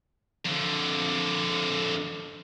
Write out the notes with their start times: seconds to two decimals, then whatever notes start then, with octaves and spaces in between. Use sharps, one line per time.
0.45 F2 D3